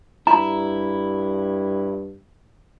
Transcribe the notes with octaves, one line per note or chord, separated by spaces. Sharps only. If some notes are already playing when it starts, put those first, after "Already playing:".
G2 E4 A#5